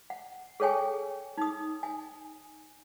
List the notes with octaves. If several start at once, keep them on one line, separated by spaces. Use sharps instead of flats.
F#5
G#4 A4 C#5 G5 G#5
D#4 D#6
G#5